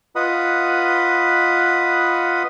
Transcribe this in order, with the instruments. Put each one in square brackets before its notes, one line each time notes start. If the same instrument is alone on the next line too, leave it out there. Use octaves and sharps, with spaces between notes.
[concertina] F4 B4 D#5 F#5 B5 D#6